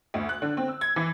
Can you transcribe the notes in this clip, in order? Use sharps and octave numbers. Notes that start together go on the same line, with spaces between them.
D2
F#6
D3
C4
E6
G#6
E3